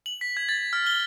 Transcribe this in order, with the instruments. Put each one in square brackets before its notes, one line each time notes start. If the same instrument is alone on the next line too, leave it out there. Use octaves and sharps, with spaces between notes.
[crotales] F#7
B6
G#6
A6
F6
G7